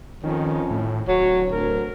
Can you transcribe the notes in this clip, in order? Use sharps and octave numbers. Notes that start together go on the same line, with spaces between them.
F2 D#3 C#4
A2
D1 F#3 C#5
D2 A#4